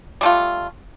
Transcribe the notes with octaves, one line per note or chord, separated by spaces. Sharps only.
G3 A3 F4